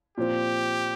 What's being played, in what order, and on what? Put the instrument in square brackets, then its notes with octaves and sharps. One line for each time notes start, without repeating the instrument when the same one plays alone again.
[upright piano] A#2 F3 C4 [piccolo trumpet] G4